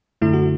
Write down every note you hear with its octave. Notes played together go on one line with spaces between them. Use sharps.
F#2 D3 A3 E4
F#4